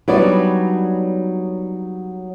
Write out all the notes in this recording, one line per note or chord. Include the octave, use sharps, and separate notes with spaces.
F#3 G3 B3 D4 D#4 D5